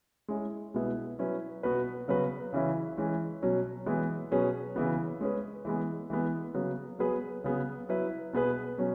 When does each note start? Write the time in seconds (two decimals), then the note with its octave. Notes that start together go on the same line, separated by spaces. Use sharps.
0.28 G#3 C#4 E4
0.74 B2 G#3 B3 E4
1.19 F#3 C#4 E4 B4
1.63 B2 B3 F#4 B4
2.08 C#3 F#3 B3 F#4 B4
2.53 C#3 E3 C#4 E4
2.97 E3 G#3 C#4
3.42 B2 F#3 C#4
3.86 E3 G#3 B3 E4
4.31 B2 F#3 C#4 G#4 B4
4.76 C#3 E3 B3
5.21 G#3 C#4 G#4 B4
5.65 E3 G#3 B3
6.10 E3 G#3 B3
6.55 C#3 F#3 B3
6.99 F#3 B3 G#4 B4
7.44 C#3 F#3 B3 G#4
7.89 F#3 E4 B4
8.33 B2 B3 G#4 B4
8.78 B2 F#3 C#4